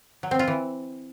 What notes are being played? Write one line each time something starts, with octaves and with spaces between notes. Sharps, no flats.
F#3
C4
F4
E3